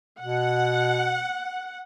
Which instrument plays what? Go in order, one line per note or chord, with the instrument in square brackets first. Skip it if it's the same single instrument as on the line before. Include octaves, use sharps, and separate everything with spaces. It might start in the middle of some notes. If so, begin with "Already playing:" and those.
[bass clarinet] B2 [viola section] F#5